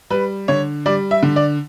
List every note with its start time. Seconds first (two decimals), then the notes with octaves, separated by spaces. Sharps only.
0.10 G3 B4
0.48 D3 C#5
0.86 G3 D5
1.11 E5
1.23 D3
1.36 D5